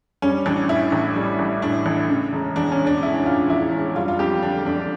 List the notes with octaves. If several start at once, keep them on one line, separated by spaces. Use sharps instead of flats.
G3 C#4
A1 D4
A2 E4
A1
G3
A1
A2 D4
A1
C#3
E1
E2 D4
C#4
E1
D4
C#3 E4
E1 F4
E2 E4
E1
G3 F4
F4
F2 G4
D3 D4
F2 D4